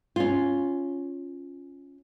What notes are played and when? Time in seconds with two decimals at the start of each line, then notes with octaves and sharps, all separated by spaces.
0.16 C#4 F4